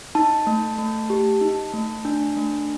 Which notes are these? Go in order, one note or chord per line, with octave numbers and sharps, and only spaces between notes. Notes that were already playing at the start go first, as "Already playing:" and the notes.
D#4 A5
A3
A3
G4
D#4
A3
D4
A3